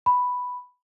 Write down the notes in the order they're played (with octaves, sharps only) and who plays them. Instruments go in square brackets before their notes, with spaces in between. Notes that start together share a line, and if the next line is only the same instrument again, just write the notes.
[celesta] B5